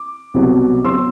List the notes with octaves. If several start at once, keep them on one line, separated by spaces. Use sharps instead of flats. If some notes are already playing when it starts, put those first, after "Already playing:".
Already playing: D6
C2 B2 F#3
B2 F#3 C6 E6